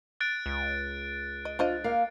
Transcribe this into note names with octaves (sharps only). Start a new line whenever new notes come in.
F#6 A6 D7
C#2
D#5
D4 F4 C5 D#5
A#3 F5